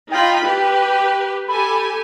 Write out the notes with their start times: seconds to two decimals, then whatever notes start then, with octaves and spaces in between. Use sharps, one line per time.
0.11 D#4 F4 G5 B5
0.43 G4 B4
1.48 G4 A4 G#5 B5